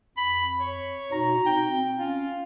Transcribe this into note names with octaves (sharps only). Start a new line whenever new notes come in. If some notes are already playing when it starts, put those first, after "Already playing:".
F2 B5
C#5
B2 D#4 F#4 A#5
C4 G5
C#4 F4